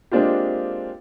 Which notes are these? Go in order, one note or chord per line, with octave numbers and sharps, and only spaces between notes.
G#3 A#3 C4 D4 F4 G4